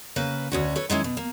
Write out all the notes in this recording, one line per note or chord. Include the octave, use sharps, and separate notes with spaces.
C#3 A#3 B4
D2 C#4 F#4
A4 B4 C#5
D#3 G#3 C#4 E4
B2
A#3